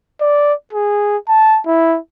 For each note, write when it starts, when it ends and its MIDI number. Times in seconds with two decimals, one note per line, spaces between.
0.21 0.53 74
0.73 1.17 68
1.29 1.59 81
1.66 1.98 64